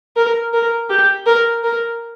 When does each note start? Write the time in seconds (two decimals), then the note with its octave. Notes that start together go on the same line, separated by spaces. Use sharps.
0.16 A#4
0.53 A#4
0.90 G4
1.26 A#4
1.64 A#4